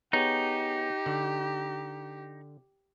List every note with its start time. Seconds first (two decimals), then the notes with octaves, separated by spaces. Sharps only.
0.13 B3 D#4 G4 G#4 C#5
1.06 D3